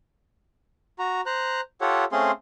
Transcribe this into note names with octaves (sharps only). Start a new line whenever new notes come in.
F#4 A#5
C5 A#5 F#6
F4 G4 A4 C#5 F#5
A3 C4 C#4 G#4 F5 C6